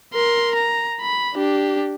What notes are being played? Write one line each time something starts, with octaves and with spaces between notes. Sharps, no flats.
A#4 C6
A#5
B5
D4 G4